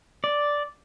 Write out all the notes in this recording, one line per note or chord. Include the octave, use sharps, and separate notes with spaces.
D5